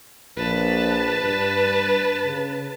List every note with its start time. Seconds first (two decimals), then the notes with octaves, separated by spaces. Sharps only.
0.37 A#1 B4 A5
1.23 G2
2.24 C#3